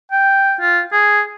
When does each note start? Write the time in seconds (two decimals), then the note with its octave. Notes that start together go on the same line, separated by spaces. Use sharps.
0.12 G5
0.61 F4
0.93 G#4